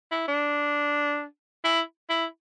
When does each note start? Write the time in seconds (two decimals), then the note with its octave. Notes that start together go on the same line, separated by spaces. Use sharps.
0.12 E4
0.28 D4
1.64 E4
2.09 E4